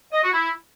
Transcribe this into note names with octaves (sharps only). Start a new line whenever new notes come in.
D#5
F#4
E4